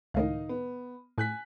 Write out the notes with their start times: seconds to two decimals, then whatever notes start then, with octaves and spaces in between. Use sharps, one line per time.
0.14 C#2 A2 D#3 D#4 D#5 F5
0.49 B3
1.18 A2 G#5 F#6 B6